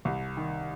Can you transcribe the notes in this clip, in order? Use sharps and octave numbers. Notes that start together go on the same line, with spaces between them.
C2
D#3